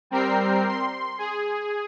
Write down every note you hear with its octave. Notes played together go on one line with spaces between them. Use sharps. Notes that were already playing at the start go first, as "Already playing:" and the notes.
G3 C4 A#4 G5 C7
C6
G#4